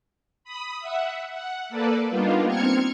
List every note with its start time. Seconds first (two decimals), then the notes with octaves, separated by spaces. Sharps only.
0.44 B5 D#6
0.80 E5 F#5
1.33 F#5
1.69 A#3 A4 B4 D5
2.10 G3 A#3 B3 D4 D#4 F4
2.47 C4 F6 G#6 C#7